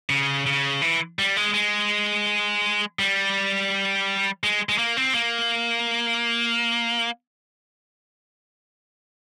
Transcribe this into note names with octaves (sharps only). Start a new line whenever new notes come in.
C#3
C#3
E3
G3
G#3
G#3
G3
G#3
G#3
A#3
C4
A#3